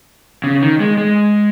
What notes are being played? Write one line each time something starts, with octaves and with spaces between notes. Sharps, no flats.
C#3
D#3
G#3
G#3